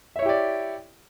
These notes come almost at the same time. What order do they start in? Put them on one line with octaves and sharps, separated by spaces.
E5 C#5 E4 G4 D5